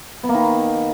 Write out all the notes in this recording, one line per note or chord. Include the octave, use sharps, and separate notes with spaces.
B3
A#3
D#3